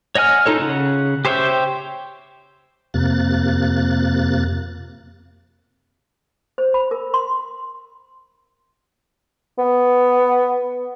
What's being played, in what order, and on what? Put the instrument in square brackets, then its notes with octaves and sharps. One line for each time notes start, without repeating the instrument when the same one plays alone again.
[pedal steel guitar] C#5 D#5 F#5 G#5 F6
D#4 F4 A4 C#5
C#3 F#5
G4 C5 C#5 E5 G5
[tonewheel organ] F2 C3 A#3 F#6 A6
[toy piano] C5
B5
A#4
C6
[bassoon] B3